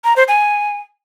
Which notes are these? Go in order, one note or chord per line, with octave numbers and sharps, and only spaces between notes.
A#5
C5
G#5